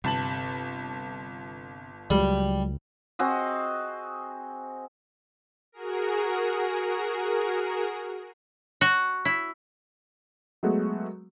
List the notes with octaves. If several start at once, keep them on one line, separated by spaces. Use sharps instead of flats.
G1 C3 A5 F#7
C#2 F#3 G3
C4 F#4 G#4 D#5
F#4 G#4 A#4
F#4
E4
F#3 G#3 A3 B3 F#4 G#4